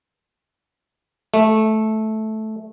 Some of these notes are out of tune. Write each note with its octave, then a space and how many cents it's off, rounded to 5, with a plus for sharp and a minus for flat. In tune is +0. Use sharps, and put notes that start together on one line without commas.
A3 -10